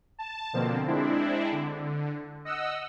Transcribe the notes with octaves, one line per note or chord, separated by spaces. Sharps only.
A5
B2 D3 F3 A#3 C4
G#3 C4 D4 E4
D3
D#5 F#5 E6